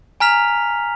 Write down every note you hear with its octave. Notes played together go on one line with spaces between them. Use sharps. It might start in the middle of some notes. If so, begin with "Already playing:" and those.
G#5 A#5 F6 B6 F7